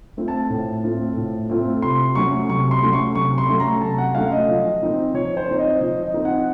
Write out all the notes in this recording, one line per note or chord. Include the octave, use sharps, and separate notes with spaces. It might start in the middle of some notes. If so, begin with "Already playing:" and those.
A3 C4 F4
A5
A2
A3 C4 F4
A2
A3 C4 F4
C3 C6
F#3 A3 C#4 C#6
C3 C#6
C6
F#3 A3 C#4
C#6
C3 C#6
C6
F#3 A3 C#4
A#5
C3 A5
F#5
F#3 A3 C#4 F5
D#5
F3
C4 D#4
F3 C#5
C5
C4 D#4
D#5
F3 D#5
D#5
C4 D#4
F#5